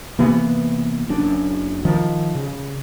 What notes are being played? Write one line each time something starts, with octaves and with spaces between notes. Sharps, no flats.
C3 E3 A#3 B3
F#1 F#2 D4
D#3 F3
C#3